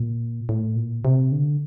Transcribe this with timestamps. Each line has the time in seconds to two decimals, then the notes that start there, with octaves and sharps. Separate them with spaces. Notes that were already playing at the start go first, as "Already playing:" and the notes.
Already playing: A#2
0.49 A2
0.76 A#2
1.05 C3
1.32 D3